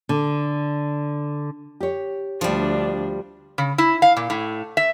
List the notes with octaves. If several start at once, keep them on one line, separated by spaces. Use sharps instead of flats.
D3
G4 C#5
D2 F3 G3 D4
C#3
E4
F5
A#2
A2
E5